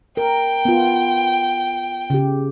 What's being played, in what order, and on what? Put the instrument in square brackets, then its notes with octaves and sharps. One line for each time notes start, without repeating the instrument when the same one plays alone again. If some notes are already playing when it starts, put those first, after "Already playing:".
[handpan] A#4 [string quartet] G5
[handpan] B3 F4
C#3 G4